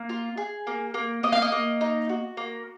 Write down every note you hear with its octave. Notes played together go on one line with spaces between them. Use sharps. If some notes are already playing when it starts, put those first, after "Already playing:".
Already playing: A#3
F4
G#4
A#3
A#3
A#3 D#5
F5
D#5
A#3
D#4
F#4
A#3